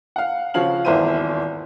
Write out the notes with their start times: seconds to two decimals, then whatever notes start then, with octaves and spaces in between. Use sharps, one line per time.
0.16 F5 F#5
0.54 C#3 F3 F#4 C#5 F5 F#7
0.85 D#1 G#1 E2 E4 C5 D#7